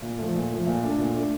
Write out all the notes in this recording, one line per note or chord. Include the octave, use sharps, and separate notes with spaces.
A#2
F3 A3
A#2
F3 A3
A#2
A3 D4
A#2
A3 D4